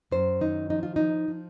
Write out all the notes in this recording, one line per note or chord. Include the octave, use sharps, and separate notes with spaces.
F#2 C5
D#3 D#4
F3 D#4
F4
F3 D#4
F3